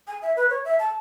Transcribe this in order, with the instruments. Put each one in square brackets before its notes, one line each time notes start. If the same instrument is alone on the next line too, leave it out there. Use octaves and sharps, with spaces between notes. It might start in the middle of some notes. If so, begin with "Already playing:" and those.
[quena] G#5
E5
B4
C#5
E5
A5